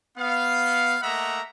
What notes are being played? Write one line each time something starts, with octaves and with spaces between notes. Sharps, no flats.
B3 F5
A3 A#3 D#5 E5 F#5 A#5